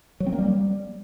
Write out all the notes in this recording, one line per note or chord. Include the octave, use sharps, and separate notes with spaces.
F#3
C4
A#3
G3